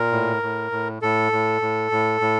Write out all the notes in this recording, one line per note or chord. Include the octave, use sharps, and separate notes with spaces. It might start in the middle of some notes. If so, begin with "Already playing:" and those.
Already playing: A#2 A#4
A2
A2
A2
A2 A4
A2
A2
A2
A2